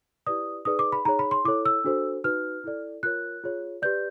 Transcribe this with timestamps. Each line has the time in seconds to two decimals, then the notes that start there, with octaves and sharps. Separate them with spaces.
0.27 E4 G4 B4 D5 D#6
0.65 D#4 G#4 B4 D5 D#6
0.79 D6
0.92 B5
1.05 D#4 G#4 C#5 A#5
1.19 B5
1.31 C6
1.45 E4 A4 C#5 D6
1.65 E6
1.84 D4 F#4 A4 C5
2.24 D#4 F#4 B4 F6
2.64 E4 A4 D5
3.03 F4 A#4 C#5 F#6
3.44 F4 G#4 C#5
3.82 G4 B4 D5 G6